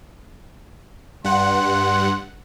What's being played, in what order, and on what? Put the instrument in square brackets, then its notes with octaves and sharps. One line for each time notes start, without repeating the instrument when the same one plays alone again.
[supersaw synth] G2 F#5 [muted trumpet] C6